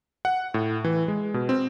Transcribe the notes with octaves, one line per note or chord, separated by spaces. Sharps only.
F#5
A2
E3
G#3
B2
C4